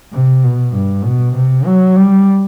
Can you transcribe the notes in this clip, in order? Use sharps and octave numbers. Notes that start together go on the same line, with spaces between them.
C3
B2
G2
B2
C3
F#3
G3